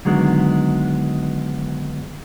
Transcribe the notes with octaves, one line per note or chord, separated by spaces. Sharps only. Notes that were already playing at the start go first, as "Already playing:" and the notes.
D3 D#3 F#3 G#3 B3